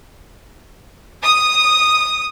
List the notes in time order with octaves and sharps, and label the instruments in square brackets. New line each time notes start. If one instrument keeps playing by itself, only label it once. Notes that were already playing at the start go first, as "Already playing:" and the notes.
[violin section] D#6